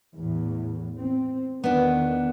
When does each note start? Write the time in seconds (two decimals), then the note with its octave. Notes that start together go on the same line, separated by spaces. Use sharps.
0.15 E2 A2
0.99 C4
1.64 E2 D#3 B3 D4